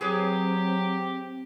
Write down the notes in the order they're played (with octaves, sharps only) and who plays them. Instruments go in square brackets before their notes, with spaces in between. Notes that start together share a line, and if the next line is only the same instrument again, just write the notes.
[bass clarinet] F#3 [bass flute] C4 [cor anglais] G4 [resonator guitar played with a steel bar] G#4 B4 C#5